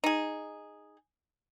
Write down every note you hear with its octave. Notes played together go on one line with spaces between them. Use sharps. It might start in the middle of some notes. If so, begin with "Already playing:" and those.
D#4 G#4